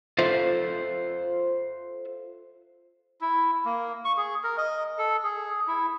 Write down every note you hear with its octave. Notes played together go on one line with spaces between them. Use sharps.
F4 A4 C5 E5 F5
E4
A#3
C#6
G#4
A#4
D#5
A4
G#4
E4